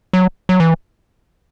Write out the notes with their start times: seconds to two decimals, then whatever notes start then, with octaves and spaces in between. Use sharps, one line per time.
0.13 F#3
0.49 F#3
0.60 E3